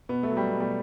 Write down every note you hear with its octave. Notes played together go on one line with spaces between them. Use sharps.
B2 B3
A3
F#3
G3
B2
G3